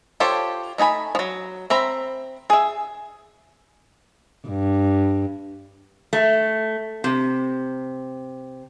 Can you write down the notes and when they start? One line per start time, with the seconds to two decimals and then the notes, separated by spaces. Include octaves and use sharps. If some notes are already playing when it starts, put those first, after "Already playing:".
0.20 F4 G4 A4 C5 C#5
0.78 A3 D#4 G#5 B5
1.15 F3 F#3
1.70 C4 E5 A#5 B5
2.50 G#4 E5
4.48 G2
6.13 A3
7.04 C3